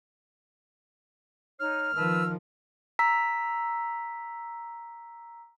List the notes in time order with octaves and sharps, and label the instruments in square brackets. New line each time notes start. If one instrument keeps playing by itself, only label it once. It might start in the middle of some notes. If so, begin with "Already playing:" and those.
[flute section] D#4 C#5 [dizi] F6
[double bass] D#3 F3 [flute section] B4 A5 E6
[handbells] A#5 E6 B6